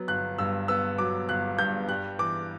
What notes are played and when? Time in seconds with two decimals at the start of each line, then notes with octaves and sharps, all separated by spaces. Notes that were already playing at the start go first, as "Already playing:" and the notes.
Already playing: F#3 B3
0.08 G1 F#6
0.38 G2 E6
0.68 B3 E6
0.98 F#3 D6
1.29 G1 F#6
1.59 G2 G6
1.89 G3 F#6
2.19 E3 D6